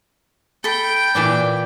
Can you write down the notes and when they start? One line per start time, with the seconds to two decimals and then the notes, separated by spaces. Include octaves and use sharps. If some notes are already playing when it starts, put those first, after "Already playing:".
0.64 A4 G5 B5
1.15 A#2 E3 D4